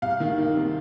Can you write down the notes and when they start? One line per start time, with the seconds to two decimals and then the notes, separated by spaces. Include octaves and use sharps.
0.02 C2 F5
0.20 D#3
0.38 A#3
0.55 C3